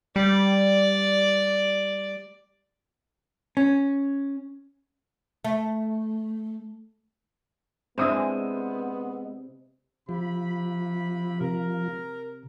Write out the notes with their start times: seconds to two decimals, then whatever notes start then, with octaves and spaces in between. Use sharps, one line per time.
0.16 G3 D5
3.57 C#4
5.45 A3
7.98 C3 G#3 B3 D4 E4 C5 D#6 E6
10.09 C3 F3 B5
11.41 C3 A#4